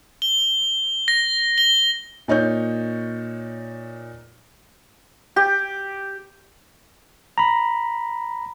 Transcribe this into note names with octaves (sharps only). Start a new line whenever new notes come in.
G7
A#6
G7
A#2 D#4 C#5 G6
G4
A#5 B5